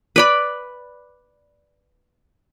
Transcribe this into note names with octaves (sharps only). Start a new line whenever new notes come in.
B4 D5 B5